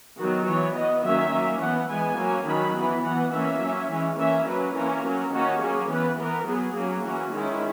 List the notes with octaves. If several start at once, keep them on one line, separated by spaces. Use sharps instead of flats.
D#3 F#3 B3 F#4
E3 B3 C#5
E3 B3 D#5
D#3 F#3 A#3 C#4 E5
F#3 A#3 C#4
E3 B3 F#5
E3 G#3 B3 G#5
F#3 A#3 C#4
D#3 F#3 C#4 B5
E3 B3
E3 B3 F#5
E3 A#3 C#4 E5
F#3 C#4
E3 G#3 C#4
E3 A#3 C#4 E5
F#3 C#4 B4
E3 A#3 C#4 A#4
F#3 C#4
D#3 A#3 C#4 F#4
F#3 A#3 C#4 G#4
E3 B3 B4
E3 B3 A#4
F#3 B3 G#4
F#3 A#3 C#4
E3 A#3 C#4 F#4
D#3 G#3 C#4 E4